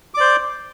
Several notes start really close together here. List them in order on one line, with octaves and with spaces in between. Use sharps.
D6 D5 C5